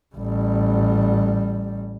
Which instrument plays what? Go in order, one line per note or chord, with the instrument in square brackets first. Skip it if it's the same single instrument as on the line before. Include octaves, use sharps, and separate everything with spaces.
[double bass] A1 G3